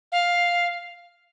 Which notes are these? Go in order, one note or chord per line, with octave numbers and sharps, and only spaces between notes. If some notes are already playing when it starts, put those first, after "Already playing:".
F5